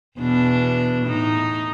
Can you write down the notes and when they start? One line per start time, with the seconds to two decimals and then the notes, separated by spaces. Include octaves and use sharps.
0.18 E2 B2 D4
1.07 A2 D#4